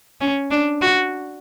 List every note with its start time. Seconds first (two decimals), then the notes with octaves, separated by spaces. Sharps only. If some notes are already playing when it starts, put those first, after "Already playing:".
0.21 C#4
0.51 D4
0.81 F#4